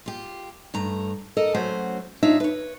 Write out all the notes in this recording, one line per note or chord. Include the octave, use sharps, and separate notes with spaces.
F4 G4
G2 A3 A#5
A4 A#4 D#5
F#3 A3 C#4 F#4 C5
D4 D#4 F4 C#5 E5
B4 C#5